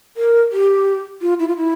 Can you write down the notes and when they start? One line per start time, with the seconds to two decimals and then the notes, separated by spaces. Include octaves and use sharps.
0.17 A#4
0.52 G4
1.22 F4
1.39 E4
1.48 F4
1.57 E4